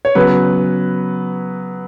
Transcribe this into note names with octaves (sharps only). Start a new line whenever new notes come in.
C#5
C#3 F#3 B3 B4